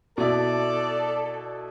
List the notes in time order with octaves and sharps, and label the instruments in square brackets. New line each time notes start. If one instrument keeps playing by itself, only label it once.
[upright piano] B2 E4 [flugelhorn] A4 [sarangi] D5